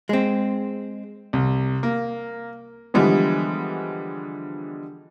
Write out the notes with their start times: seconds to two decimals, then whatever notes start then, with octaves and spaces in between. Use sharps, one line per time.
0.09 G#3 C4
1.33 C2
1.83 A#3
2.94 D3 E3 F3 G3 G#3 B3